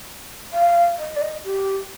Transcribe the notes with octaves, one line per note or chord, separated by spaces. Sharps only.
F5
D#5
D5
D#5
G4